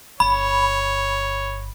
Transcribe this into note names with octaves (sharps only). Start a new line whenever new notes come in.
G1 C#5 B5